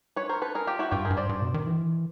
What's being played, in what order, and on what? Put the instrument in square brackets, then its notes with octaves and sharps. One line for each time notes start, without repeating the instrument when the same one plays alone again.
[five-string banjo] B4 C#5
A#4 C5
A4 B4
G#4 A#4
F4 G4
E4 F#4
[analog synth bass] G2 [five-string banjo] F4 G4
[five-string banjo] G#4 A#4
[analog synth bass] G2
[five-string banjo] C5 D5
[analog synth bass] G2
B2
D#3
E3